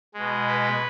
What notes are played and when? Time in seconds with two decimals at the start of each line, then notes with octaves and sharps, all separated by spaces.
0.14 B2 G#3
0.48 B4